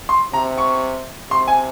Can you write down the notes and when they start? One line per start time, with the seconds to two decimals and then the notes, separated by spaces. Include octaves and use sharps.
0.09 C6
0.33 C3 A#5
0.58 C#6
1.31 C3 C6
1.48 G#5